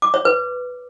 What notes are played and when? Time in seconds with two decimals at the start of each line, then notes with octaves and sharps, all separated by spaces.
0.02 D6
0.14 C#5
0.25 B4